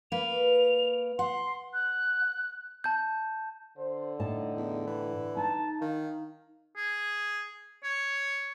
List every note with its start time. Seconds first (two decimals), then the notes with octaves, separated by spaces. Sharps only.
0.12 A#3 B4 F7
1.19 F#5 C6
1.74 F#6
2.84 A5 G6
3.78 D3 C5
4.19 A2 D#4 D#5 A5
4.57 E2
4.87 E3
5.37 D#4 A5
5.81 D#3 F5
6.77 G#4
7.84 C#5